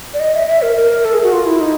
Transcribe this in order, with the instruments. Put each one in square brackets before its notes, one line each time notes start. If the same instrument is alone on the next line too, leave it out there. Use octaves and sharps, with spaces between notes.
[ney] D5
D#5
E5
E5
A#4
A#4
A4
G#4
F#4
F4
E4
D#4